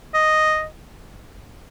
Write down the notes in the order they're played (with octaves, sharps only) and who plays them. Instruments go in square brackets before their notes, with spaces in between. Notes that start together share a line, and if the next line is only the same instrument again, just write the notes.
[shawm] D#5